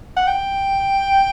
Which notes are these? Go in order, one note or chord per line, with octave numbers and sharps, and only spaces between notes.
F#5
G5